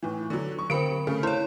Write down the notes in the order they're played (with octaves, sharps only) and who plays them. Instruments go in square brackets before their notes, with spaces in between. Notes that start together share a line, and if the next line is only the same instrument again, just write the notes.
[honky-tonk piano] A2 E3
D3 F#3
C#6
[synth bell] D3 A#4 B5 [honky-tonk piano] C4 C#7 D7
[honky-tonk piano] C#3 A3
[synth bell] E4 C#5 [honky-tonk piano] C5